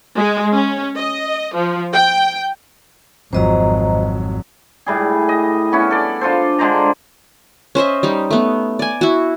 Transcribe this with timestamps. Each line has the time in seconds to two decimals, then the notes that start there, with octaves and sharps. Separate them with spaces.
0.17 G#3
0.54 C#4
0.98 D#5
1.54 F3
1.93 G5
3.33 G#1 F2 F#3 C5 D#5 A#5
4.86 A2 G3 G#4
5.29 D#5
5.72 B3 C#4 E4
5.91 A4 D5
6.21 D4 F4 A4 C5
6.58 D3 G#3 C5 A#5
7.75 C#4 C5 D#5 E5
8.03 G3 D#4 G4
8.31 A3 B3
8.79 D5 G#5
9.01 E4 F#4